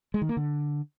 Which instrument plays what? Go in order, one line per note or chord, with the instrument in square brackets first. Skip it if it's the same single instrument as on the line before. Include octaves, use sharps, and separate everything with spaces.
[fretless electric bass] G#3
D#3
A#3
D3